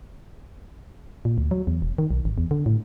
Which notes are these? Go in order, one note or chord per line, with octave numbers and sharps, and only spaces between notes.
A#2
D2
F#3
E2
E1
D#3
B1
G#1
E2
D3
A2